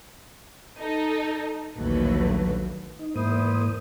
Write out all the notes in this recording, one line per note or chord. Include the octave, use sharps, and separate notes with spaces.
D#4 A4
A#1 D#2 D3 F#3 A3 B4
D#4
E2 G#2 A#3 E4 C5 D#6